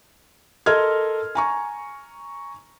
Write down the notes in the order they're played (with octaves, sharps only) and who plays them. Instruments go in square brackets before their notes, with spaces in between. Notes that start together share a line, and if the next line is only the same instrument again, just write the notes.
[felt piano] A4 A#4 D#5 C6 F6 G#6
G#5 A#5 C#6